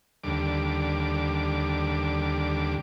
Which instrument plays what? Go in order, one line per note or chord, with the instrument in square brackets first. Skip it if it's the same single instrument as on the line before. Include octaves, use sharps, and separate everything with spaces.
[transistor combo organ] D#2 D3 G3 D6